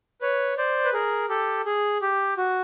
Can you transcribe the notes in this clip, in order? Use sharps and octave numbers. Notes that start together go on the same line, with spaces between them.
B4 C#5
C5 D5
B4
G#4 A#4
G4 A4
G#4
G4
F#4